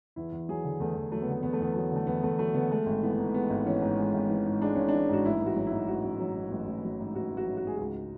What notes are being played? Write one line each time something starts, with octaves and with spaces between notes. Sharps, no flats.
E2 E4
E2
F#3 G#4
D3
E2 A3
E2
F#3 A3
B3
D3 A3
E2 B3
A3
E2 B3
F#3 A3
D3 A3
E2 B3
E2 A3
F#3 A3
D3 B3
G#3 A3
G#1
E3 B3
G#2
G#3 B3
G#1
E3 C#4
G#2
G#3
G#1
E3
G#2
G#3 D4
G#1 C#4
E3 D4
G#2 F#4
A1 E4
A1
F#4
F#3
E4
G#2
A1 F#4
A1
F#3
G#2
A1
A1
F#3
G#2
A1 F#4
A1
F#4
F#3
F#4
G#2 G#4
C#2 F#4